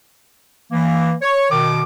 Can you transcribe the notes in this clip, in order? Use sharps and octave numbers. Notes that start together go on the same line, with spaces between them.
E3 A#3
C#5
B2 D#3 D6